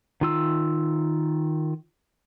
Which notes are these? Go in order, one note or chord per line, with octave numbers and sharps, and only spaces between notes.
D#3 F4 E6